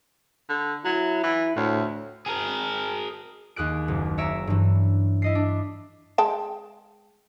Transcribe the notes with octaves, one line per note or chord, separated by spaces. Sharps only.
D3
F#3 E4
E3
D2 A2
G#4 A#4
D#2 G#4 F#6 D7
F#1
C#5 E5 A#5 D7 E7
G2 E3
E4 D#5 C7
D4
G#3 G5 A5